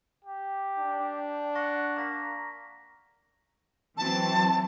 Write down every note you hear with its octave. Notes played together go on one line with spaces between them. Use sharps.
G4
D4
F#5 C#6 A#6
A#3 A#5 A#6 B6
E3 F#3 C4 A5